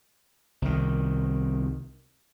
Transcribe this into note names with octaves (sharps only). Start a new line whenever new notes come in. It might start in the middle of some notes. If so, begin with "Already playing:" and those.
C2 D#3